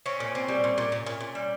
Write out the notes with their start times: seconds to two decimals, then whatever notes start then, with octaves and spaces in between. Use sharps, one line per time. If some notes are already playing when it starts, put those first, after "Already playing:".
0.06 C4 C#4
0.20 A#2
0.35 C4
0.48 G3
0.64 A#2
0.78 A#2
0.92 A#2
1.06 A#2
1.21 A#2
1.35 G3